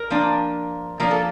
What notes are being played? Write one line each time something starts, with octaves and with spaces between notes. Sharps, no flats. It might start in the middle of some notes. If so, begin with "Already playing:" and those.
Already playing: A#4
F3 A#3 D4
F3 A#3 D4 A#4
A4